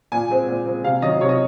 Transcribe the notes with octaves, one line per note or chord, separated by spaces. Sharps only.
A#2 G#5
G#3 C4
A#2
G#3 C4
C3 F5
D#3 F#3 C#4 D#5
C3 C#5
D#5